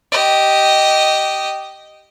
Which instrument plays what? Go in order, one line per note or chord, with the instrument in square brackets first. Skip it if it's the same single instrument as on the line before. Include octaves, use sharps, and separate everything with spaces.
[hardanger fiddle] G4 D#5